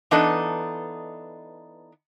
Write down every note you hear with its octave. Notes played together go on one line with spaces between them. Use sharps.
E3 B3 D4 D#4 A4 D#5